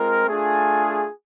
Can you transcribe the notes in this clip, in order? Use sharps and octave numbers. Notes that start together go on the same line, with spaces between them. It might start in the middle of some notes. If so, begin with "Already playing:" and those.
Already playing: G#3 C4 F4 A#4
A3 D4 F4 G#4